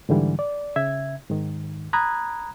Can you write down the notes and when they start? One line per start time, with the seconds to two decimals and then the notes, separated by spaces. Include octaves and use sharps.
0.09 G#2 D3 E3 G3
0.39 D5
0.76 C#3 E5 G#6
1.30 G#2 D#3
1.93 A#5 B5 D#6 F#6 G#6